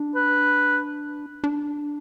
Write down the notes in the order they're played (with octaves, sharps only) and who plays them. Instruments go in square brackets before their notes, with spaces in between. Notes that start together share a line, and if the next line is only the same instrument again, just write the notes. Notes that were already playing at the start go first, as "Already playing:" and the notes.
Already playing: [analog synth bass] D4
[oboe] B4
[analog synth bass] D4